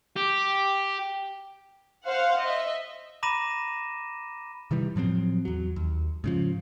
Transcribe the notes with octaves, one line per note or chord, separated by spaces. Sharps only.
G4
C5 F5 F#5
D#5 E5
A#5 B5 D6 A#6 D#7 E7
C3 D#3 E3 G3
A2 F3 F#3 C4
E2 F#3
D#2
G#2 C#3 F3